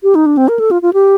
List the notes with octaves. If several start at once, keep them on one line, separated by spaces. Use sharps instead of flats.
G4
D#4
D4
C4
A#4
A4
F4
F4
G4